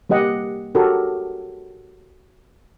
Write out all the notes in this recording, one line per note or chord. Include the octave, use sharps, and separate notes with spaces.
G3 A#3 G4 D#5 F#5
F#4 G4 A4 A#4